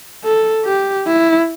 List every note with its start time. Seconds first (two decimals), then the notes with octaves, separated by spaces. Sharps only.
0.24 A4
0.65 G4
1.07 E4